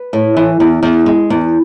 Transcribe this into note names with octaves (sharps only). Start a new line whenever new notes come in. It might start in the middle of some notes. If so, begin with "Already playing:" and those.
Already playing: B4
A2
E3
E2
E2
G#3
E2